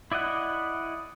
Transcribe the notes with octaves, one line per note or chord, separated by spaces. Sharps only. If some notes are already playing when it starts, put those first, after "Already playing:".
E4 D5 D#5 F#5 F#6